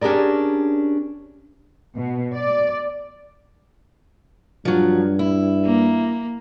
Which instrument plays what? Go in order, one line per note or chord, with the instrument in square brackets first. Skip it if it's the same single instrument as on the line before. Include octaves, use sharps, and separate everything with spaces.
[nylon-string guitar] C#4 D4 G4 G#4 A#4 D5
[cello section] B2
D5
[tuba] G2 [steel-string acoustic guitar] F3 F#3
[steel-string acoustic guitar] E4
[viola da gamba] A#3